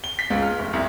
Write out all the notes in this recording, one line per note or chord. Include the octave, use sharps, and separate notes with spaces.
G7
B6
C#2
F6
F1
C2